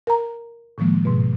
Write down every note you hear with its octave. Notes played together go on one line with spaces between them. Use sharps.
A#4 A#5
A2 D#3 F3 G#3 A#3
G#2 B2